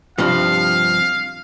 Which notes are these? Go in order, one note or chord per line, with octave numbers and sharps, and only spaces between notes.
G2 C3 F3 F5